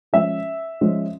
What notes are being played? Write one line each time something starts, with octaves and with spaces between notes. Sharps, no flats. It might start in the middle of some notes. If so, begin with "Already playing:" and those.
F3 G#3 C#4 E5
F3 G#3 C#4